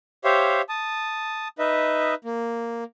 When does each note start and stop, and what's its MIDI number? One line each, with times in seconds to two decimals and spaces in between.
0.24 0.62 67
0.24 0.62 72
0.24 0.62 73
0.24 0.62 76
0.24 0.62 77
0.69 1.48 81
0.69 1.48 87
1.59 2.14 63
1.59 2.14 71
1.59 2.14 75
1.59 2.14 76
2.25 2.84 58